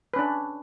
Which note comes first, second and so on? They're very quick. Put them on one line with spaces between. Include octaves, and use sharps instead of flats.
B4 C#4 D4